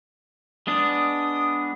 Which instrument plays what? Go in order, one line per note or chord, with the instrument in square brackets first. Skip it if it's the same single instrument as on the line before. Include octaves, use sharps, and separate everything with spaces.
[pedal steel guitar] G#3 B3 D4 [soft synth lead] D#6